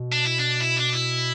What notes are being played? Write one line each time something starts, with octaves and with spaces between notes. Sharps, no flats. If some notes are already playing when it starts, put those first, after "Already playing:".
Already playing: B2
D4
E4
D4
E4
D4
E4